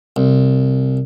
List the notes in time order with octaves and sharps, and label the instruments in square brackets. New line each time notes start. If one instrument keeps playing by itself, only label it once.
[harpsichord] C2